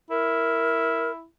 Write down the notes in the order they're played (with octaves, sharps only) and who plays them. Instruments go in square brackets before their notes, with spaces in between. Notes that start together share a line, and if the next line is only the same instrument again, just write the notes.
[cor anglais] E4 [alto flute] A#4